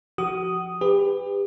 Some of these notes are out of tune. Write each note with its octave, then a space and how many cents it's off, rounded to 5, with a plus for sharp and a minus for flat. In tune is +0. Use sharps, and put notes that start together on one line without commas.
F3 +0 F#4 +30 D#6 +0
G4 +30 B4 +15